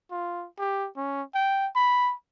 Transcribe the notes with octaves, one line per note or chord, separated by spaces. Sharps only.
F4
G4
C#4
G5
B5